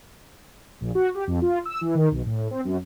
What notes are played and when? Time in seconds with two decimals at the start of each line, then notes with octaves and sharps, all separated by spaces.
0.81 A#1
0.95 F#4
1.15 G4
1.27 F2
1.42 F4
1.65 E6
1.81 E3
1.95 D#3
2.12 B1
2.26 A2
2.51 C4
2.65 F#2